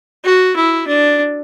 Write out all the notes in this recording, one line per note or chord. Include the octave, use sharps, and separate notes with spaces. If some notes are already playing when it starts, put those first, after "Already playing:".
F#4
E4
D4